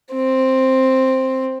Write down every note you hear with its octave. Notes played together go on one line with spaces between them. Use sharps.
C4